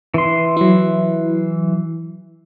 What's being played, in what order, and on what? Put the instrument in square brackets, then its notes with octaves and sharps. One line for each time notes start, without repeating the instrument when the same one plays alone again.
[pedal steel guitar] E3 C6
[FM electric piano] F#3 E4